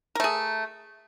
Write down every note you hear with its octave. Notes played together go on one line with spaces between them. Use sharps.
A3 G#4 A#4